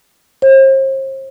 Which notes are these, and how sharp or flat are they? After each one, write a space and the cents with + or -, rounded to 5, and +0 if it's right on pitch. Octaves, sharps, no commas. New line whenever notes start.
C5 +40